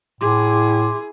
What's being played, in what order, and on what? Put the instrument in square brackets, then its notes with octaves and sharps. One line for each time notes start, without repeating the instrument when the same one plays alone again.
[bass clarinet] A2 [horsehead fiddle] E4 G#4 [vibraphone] C6 D6